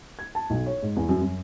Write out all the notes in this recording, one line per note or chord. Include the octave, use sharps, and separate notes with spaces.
G#6
A5
B1
C#5
G#2
E2
F#2
F#2